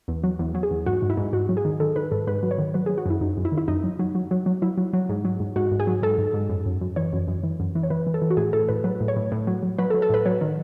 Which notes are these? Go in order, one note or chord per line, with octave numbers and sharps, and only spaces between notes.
E2
F#3
E2
F#3
G#4
E2
G#2 F#4
G#2
E4
G#2
G#2 F#4
F#3
G#4
D#3
D#3 A4
D#3 B4
G#2 A4
G#2 B4
F#3
C#5
D#3
F#3 B4
F#3 G#4
F#4
F#2 E4
F#2 D#4
F#2
E4
D#3
E4
F#2 D#4
F#3
F#3
F#3
F#3
F#3
F#3 E4
F#3
F#3
G#2
F#3
G#2
G#2 F#4
G#2
G#4
F#3
G#2 A4
G#2
G#2
F#2
F#2
F#2
E3 C#5
F#2
F#2
E3
F#2
E3
C#5
E3 B4
E3
A4
E3
F#4
A2 G#4
A2 A4
A2 B4
F#3 B4
A2
C#5
A2
A2
F#3
F#3
F#3 B4
A4
F#3
A4
A2 B4
F#3 C#5
D#3